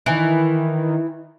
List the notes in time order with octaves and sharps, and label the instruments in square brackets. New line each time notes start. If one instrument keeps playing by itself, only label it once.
[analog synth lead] D#3 [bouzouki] E3